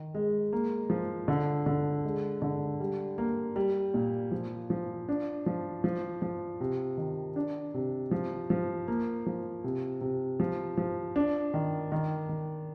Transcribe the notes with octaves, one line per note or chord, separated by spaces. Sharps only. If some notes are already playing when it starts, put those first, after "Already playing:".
Already playing: D#3
G#3
A#3
F3
D3
D3
G#3
D3
G3
A#3
G3
A#2
F3
F3
D4
F3
F3
F3
C3
D#3
D4
C3
F3
F3
A#3
F3
C3
C3
F3
F3
D4
D#3
D#3
D#3